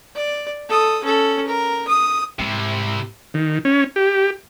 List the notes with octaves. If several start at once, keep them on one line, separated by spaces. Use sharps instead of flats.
D5
A4 D#6
C#4 A4
A#4
D#6
G#2 C3 E4
D#3
C#4
G4